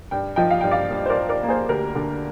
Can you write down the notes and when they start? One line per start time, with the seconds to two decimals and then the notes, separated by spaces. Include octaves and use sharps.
0.11 G2 G5
0.36 F3 D#5 G5
0.50 F5
0.61 G2 G5
0.71 D5 F5
0.91 G2
1.06 C5
1.09 A#4 D5
1.16 G2
1.29 A#4 D5
1.43 A#3
1.49 G#4 C5
1.69 D2 G4 A#4
1.95 D3